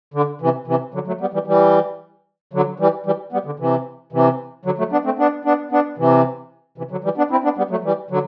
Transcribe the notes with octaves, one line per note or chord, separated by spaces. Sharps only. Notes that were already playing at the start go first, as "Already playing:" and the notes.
D3
C3 E3
C3 E3
D3 F#3
F#3 A3
G3 B3
E3 G3
E3 G3
D3 F#3
E3 G3
E3 G3
G3 B3
D3
C3 E3
C3 E3
D3 F#3
F#3 A3
B3 D4
A3 C4
B3 D4
B3 D4
B3 D4
C3 E3
C3 E3
D3 F#3
E3 G3
B3 D4
C4 E4
B3 D4
G3 B3
F#3 A3
E3 G3
D3 F#3